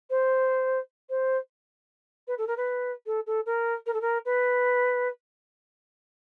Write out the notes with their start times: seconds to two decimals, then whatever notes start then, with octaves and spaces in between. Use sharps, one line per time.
0.10 C5
1.10 C5
2.28 B4
2.38 A4
2.47 A#4
2.57 B4
3.06 A4
3.27 A4
3.46 A#4
3.86 A#4
3.94 A4
4.01 A#4
4.25 B4